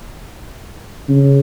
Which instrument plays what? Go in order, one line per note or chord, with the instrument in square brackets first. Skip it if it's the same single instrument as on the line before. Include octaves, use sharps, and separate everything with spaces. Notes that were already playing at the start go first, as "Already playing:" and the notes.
[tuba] C#3